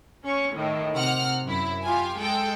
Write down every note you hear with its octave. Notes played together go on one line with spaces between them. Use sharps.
C#4 C#6
A2 D#3
C3 F#5 F6
F#2 E4
F4 G4 G#5
G#3 A4 G5